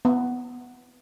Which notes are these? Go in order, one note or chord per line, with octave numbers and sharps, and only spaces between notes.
B3